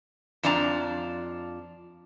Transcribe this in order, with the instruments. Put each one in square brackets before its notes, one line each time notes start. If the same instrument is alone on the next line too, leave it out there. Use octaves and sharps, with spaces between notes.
[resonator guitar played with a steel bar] F2 F3 D4 D5 A5 A#5